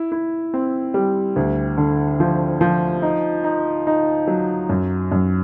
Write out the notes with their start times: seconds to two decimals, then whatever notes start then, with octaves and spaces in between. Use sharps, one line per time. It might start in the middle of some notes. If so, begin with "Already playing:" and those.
Already playing: E4
0.12 E4
0.54 C4
0.94 G3
1.36 D2
1.77 D3
2.20 F3
2.61 F3
3.02 D#4
3.44 D#4
3.87 D#4
4.27 F#3
4.69 F#2
5.12 F#2